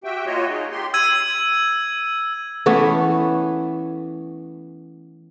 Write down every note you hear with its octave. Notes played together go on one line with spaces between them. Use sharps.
F#4 G4 E5 G5
A#3 F4 F#4 C#5 D#5
D#4 G#4
G4 C6
E6 G#6 D#7
E3 A3 B3 C#4